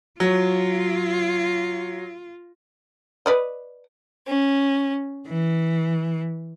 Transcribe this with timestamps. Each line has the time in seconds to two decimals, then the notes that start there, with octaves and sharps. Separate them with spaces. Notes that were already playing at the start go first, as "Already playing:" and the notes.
0.20 F#3 F4
3.26 B4 D5 D#5
4.26 C#4
5.28 E3